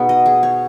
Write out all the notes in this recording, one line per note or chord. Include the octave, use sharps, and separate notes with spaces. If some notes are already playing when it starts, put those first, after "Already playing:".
Already playing: B2 B3 D#4 G#4
D#5
G#4
C#5